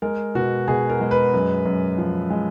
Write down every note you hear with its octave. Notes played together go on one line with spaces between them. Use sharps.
G#3 A#4
B2 F#4
B2 G#4
A#4
G#3
B4
F#2
F#2
F3
G#3